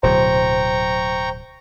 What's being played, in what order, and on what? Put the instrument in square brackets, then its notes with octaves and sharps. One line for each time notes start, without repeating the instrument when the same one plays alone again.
[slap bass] D1 B2 F#3 [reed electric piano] C5 [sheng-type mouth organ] G5 A#5 C#6